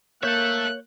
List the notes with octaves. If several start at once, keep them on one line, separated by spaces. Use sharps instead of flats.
A#3 A4 C#5 E5 F#6 G6